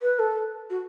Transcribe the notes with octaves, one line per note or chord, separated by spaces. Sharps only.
B4
A4
F#4